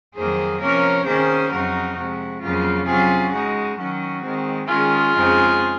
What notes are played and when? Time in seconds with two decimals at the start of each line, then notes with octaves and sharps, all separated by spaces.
0.15 F2 D#3 F#3 A#3 G#4 C5
0.60 C3 F3 A#3 C#4 A#4 C#5
1.05 D#3 A#3 C#4 G#4 C5
1.50 F2 C#3 F#3 C4 D#4 F#4 A#4
1.95 C3 F3 G#3 F#4
2.41 F2 C#3 F#3 A#3 F4
2.86 C3 F#3 C#4 F4 G#4
3.31 C#3 G#3 D#4 F#4
3.77 D#3 F#3 C#4 F#4
4.22 D#3 G#3 C4
4.67 D#3 G#3 C#4 F4 G#4
5.12 F2 C#3 G#3 C4 D#4